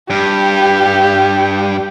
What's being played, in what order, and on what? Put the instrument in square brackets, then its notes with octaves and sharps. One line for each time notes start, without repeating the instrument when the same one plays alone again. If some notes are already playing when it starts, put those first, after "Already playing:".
[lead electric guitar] G2 [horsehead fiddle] G4